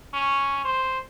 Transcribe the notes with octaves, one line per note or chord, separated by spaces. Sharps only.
C#4
C5